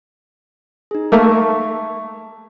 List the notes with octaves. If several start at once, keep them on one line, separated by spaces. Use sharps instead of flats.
D#4 G#4
A3 A#3 E5 A5 C#6